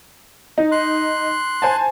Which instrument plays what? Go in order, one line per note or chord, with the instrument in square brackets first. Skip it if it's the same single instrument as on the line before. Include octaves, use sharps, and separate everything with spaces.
[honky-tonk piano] D#4
[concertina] C6 F#6
[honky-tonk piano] C5 G#5 A5